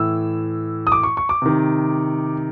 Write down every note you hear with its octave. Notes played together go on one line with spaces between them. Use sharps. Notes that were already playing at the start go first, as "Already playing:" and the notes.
Already playing: A2 E3 E6
D#6
D6
C#6
C#6
D6
C3 D#3